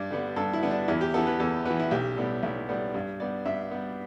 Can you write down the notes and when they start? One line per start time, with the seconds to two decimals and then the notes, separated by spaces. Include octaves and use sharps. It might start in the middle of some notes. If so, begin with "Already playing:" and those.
Already playing: G2 D5
0.11 D3 G3 B3
0.36 G2 A4
0.53 E4
0.63 D3 G3 B3
0.71 D4
0.88 E2 E4
1.01 G4
1.14 E3 B3 A4
1.27 B4
1.40 E2 A4
1.65 E3 B3 B4
1.80 E4
1.91 B1 G4
2.17 A2 G3 B3
2.43 B1
2.69 A2 G3 B3
2.94 G2
3.20 G3 B3 D5
3.45 G2 E5
3.71 G3 B3